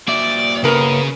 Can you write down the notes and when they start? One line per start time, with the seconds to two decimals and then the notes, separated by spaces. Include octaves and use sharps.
0.08 A#3 F#4 D5 E5
0.64 C#3 B3 A#4